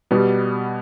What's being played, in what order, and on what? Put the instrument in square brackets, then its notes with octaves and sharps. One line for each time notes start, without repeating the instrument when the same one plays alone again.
[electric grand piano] B2 B3 [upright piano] G3